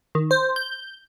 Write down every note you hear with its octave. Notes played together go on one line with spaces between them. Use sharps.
D#3
C5
G6